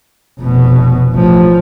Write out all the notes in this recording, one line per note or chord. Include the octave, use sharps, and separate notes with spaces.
F1 B2
A1 F3